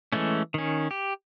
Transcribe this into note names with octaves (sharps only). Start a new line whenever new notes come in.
E3 G#3 A3 C#4
D#3 C#4
G4